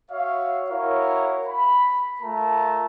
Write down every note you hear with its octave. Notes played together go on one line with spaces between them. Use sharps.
F#4 C#5 E5 F5
E4 F#4 A#4 C#5 F5
B5
A3 F4 A#4 A5 A#5